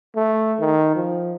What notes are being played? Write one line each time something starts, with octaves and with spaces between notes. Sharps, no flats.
A3
D#3
F3